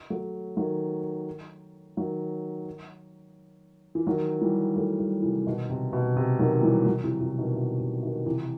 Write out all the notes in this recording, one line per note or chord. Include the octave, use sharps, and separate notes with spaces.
F#3 A3
D#3 F#3
D#3 F#3
E3
D#3 F#3
E3 G3
F#3 A3
E3 G3
C3 E3
B2 D#3
C3
B2
C3
D#3 F#3
E3 G3
D#3 F#3
C3 E3
C3 E3
B2 D#3
B2
C3
B2 D#3
C3 E3